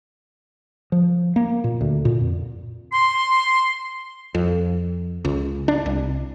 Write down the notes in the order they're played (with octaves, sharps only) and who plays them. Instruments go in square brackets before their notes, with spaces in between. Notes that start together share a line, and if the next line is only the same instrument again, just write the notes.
[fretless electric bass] F3
A#3
A#2
D2
A#2
F2
[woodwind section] C6
[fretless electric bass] F2
C#2
D4
C2